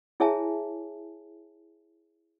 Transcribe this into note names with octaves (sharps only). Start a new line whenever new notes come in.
E4 G#4 C#5 E5 G#5 A5